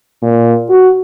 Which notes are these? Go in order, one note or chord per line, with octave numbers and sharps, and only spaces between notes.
A#2
F#4